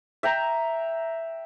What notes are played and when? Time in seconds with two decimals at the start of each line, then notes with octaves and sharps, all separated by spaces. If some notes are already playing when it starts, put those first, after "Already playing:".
0.23 E5 G5 A#5